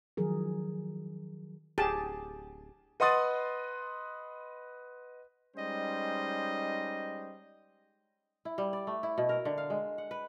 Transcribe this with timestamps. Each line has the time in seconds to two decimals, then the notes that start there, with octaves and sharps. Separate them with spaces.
0.17 D#3 F3 F#3 G#4 A#4
1.78 D1 G4 G#4 A5
3.00 B4 D#5 F#5 C6 D#6 A6
5.56 G3 G#3 C#4 D#4 C5 D#5
8.45 E4
8.58 G3
8.73 D5
8.87 A3
9.03 E4
9.18 B2
9.29 A#4
9.45 D3
9.58 F5
9.70 G#3
9.98 F#5
10.11 B4